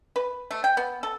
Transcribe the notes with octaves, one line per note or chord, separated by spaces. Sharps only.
B4
A3
G5
B3
A4